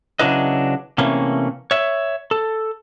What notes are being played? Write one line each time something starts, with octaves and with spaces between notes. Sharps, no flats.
C#3 F#3 D4 E4 B4 D#5
C3 E3 A3 A#3 C#4
C#5 E5
A4